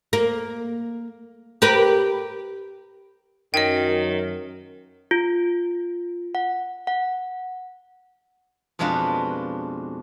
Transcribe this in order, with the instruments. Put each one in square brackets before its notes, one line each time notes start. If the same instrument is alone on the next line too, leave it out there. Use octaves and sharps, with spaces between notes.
[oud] A#3
G4 A#4 B4
[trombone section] F#2 [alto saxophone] D#3 [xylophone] D#5 G5
[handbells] F4
F#5
F#5
[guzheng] F2 B2 G#3 D4 F4 B4